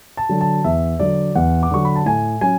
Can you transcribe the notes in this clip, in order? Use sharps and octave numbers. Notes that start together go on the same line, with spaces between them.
A5
D3 F#3
A5
E2 E5
D3 F#3 D5
E2 F#5
D6
D3 F#3 C#6
B5
A5
A2 G#5
F#3 C#4 G#5